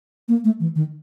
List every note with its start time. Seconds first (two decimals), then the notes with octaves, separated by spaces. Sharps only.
0.28 A#3
0.44 A3
0.60 E3
0.75 D#3